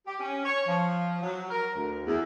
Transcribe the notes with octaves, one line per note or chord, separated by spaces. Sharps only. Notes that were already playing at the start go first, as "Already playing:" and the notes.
G4
C#4
C#5
F3
F#3
A#4
D2
E2